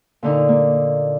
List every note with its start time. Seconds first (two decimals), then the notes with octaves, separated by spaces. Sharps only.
0.23 A#2 D3 D#4
0.49 A#3